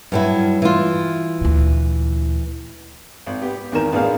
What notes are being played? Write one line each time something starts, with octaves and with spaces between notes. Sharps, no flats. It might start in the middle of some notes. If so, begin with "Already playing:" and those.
G2 F#3 E4
E3 F4
D2 A#2
G#1
B3 G4
G#1 E2 D#3 C4 A#4 E7
A1 B3 D4 G#4 A#4 F5